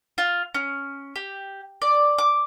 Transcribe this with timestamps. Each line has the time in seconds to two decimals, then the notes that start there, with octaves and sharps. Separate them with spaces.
0.18 F4
0.54 C#4
1.16 G4
1.82 D5
2.18 D6